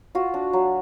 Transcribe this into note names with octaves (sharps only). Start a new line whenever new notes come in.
F4 F#4
D4
F#3